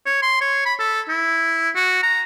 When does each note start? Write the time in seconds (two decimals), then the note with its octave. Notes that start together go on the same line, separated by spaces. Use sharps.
0.06 C#5
0.22 C6
0.41 C#5
0.66 B5
0.79 A4
1.09 E4
1.75 F#4
2.03 A#5